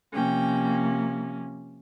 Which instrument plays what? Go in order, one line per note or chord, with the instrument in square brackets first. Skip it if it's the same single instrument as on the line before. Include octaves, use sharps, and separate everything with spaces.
[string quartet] C3 F3 A#3 C#4 G5